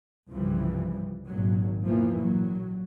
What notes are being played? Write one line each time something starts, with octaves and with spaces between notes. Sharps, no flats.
C2 G2 C#3 E3 F3 G3
G#1 A#2 F#3
F1 E2 E3 F3 A#3
A#1 A2 F#3